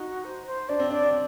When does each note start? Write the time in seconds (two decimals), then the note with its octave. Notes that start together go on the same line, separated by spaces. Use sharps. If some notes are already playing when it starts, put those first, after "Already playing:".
Already playing: D#4 F#4
0.25 C5
0.47 C5
0.69 D4 D5
0.80 C4
0.91 D4 D5
1.03 C4